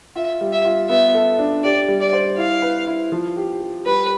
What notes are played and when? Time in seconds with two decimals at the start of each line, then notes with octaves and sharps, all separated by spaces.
0.15 F4 E5
0.41 G3
0.52 E5
0.65 F4
0.89 B3 E5
1.14 A4
1.39 D4
1.64 G4 D5
1.88 G3
2.01 D5
2.13 C5
2.38 E4 F5
2.62 B4
2.87 E4
3.12 F3
3.36 G4
3.61 G4
3.86 G3 B4